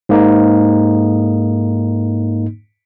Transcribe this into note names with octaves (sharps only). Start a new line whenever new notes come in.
G#2 A#3 D#4